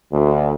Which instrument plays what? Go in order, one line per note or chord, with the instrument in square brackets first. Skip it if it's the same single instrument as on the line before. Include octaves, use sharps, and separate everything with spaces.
[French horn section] D2